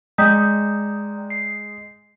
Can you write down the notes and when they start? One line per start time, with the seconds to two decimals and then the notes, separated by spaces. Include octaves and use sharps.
0.18 G#3 D5 G5 A#5 D#6 G6 B6
1.30 C7